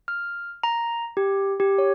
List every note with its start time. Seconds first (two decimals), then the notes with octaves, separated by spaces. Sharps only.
0.08 F6
0.63 A#5
1.17 G4
1.60 G4
1.78 C#5